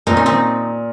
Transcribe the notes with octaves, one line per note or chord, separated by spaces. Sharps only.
A#2 C4 D#4
C#4
C4 D#4